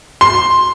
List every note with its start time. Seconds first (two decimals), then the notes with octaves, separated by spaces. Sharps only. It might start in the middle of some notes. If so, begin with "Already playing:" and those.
0.21 C6